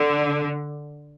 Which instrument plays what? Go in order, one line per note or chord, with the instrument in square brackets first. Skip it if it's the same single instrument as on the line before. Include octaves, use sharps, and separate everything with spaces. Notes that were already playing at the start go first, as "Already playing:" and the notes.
Already playing: [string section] D3